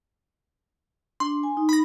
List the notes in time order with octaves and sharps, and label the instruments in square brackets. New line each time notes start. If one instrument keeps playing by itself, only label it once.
[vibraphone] D4 [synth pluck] C6
[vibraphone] G#5
D#4
[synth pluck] B5 A#6